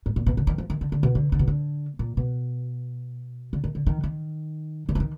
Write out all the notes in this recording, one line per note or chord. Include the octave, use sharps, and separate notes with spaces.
G#2
A#2
B2
D3
D#3
F3
D#3
D3
D3
B2
D3
D3
B2
D3
A#2
B2
D3
D#3
D3
D#3
D#3
D#3
F3
D#3